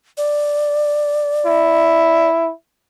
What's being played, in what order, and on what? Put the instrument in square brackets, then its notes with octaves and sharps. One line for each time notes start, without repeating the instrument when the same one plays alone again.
[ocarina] D5
[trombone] E4